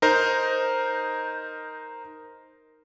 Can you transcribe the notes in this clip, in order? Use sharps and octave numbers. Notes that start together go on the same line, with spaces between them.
D#4 A#4 C5